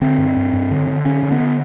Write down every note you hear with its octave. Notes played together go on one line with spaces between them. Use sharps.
D3 C4
G2
G2
G2
D3
D3
D3 C#4
D3
B3
D3